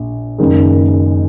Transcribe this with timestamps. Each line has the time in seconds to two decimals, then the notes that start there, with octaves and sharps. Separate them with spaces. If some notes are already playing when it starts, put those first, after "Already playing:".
Already playing: A#1
0.38 F#1 F#2 D#3 G#3